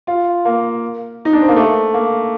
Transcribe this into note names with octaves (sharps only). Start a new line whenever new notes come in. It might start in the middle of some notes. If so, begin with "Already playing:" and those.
F4
A#3
D#4
D4
C4
A#3
A3
A#3